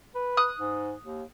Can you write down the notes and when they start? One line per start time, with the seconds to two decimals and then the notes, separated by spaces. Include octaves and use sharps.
0.15 B4
0.37 D#6 F#6
0.59 G#2
1.04 D#2